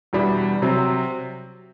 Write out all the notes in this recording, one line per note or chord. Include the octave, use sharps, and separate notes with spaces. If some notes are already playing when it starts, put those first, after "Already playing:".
E2 B2 G3 D4
C3 F#3 C4